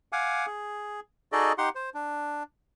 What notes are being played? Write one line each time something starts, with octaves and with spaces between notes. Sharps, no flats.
F5 F#5 G#5 D6
G#4
D#4 F#4 G#4 A4 D5 D#5
D#4 G4 F#5 C6
C5
D4